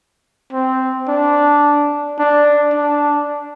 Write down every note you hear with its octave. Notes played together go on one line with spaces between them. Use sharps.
C4
D4
D4
D4